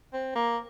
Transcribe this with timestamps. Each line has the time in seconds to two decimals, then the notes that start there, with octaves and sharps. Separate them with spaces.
0.13 C4
0.35 A#3